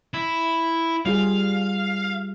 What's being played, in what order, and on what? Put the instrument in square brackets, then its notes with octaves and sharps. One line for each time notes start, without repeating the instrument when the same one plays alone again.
[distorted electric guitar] E4
[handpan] G3 F4 G#4 [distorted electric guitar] F5